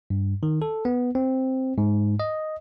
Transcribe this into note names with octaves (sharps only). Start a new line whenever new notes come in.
G2
D#3
A4
B3
C4
G#2
D#5